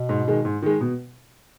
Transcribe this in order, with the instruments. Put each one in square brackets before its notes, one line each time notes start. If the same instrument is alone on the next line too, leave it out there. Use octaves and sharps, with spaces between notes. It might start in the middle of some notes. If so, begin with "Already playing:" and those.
Already playing: [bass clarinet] B2
[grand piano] G#2
D#3 G#3
G#2
D#3 G#3
B2